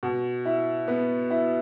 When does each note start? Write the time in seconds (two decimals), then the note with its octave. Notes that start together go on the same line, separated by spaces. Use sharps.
0.03 B2
0.46 E4
0.88 B3
1.30 E4